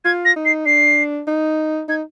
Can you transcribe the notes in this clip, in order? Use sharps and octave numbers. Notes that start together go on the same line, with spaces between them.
F4 G#6
A#6
D#4
C7
D4 C7
D#4
D#4 G#6